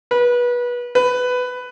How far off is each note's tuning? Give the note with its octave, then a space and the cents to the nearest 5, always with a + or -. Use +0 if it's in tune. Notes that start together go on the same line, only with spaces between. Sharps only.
B4 -25
B4 +15